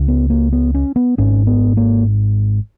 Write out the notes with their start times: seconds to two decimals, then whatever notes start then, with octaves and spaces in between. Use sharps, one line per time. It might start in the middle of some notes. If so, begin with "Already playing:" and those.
Already playing: C#2 C#3
0.08 B3
0.30 A#3
0.53 B3
0.75 C#4
0.96 B3
1.18 G#1 G#2 C#4
1.47 B3
1.77 A#3